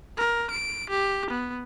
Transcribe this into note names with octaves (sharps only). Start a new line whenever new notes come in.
A#4
D7
G4
B3